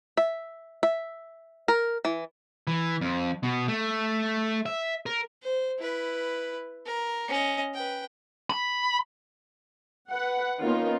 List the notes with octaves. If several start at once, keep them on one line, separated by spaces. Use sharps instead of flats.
E5
E5
A#4
E3
E3
F2
B2
A3
E5
A#4
C5
E4 B4
A#4
C#4 D#5
B4 G5
B5
B4 F#5
D#3 A#3 B3 C#4 D#4 F4